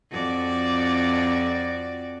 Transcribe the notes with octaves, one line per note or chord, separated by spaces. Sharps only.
F2 F#4 D5